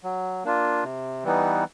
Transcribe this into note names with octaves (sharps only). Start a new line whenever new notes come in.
F#3
A#3 D4 F4
C3
E3 G3 B3 D#4